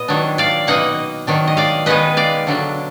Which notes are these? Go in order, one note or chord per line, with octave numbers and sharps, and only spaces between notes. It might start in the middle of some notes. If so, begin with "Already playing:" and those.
Already playing: A#2 B3 D#5
D#3 F#3 D4
D5 F5
B2 A#3 D#4 D#5 F#5
D#3 F#3 D4
D#5
D5 F5
D#3 G#3 B3 D#4 B4 D#5
D5 F5
D3 F#3 D4